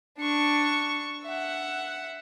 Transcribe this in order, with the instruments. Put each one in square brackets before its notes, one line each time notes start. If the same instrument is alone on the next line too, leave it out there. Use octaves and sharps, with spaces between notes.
[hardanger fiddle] D4 C#6
E5 F#5